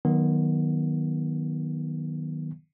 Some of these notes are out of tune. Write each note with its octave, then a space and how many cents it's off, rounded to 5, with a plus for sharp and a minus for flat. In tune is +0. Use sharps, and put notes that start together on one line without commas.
D#3 +5 F#3 +0 B3 -20